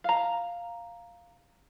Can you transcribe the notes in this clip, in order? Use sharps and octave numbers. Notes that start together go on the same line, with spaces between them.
F5 A#5